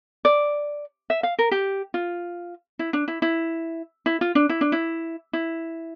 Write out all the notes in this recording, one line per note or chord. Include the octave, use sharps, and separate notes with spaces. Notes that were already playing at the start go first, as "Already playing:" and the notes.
D5
E5
F5
A#4
G4
F4
E4
D4
E4
E4
E4
F4
D4
E4
D4
E4
E4